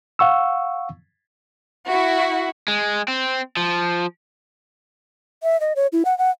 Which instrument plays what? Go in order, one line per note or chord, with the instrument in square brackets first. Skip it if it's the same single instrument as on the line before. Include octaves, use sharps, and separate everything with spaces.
[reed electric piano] F5 F#5 C#6 E6
[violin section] E4 F#4
[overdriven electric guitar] G#3
C4
F3
[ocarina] E5
D#5
C#5
E4
F#5
F#5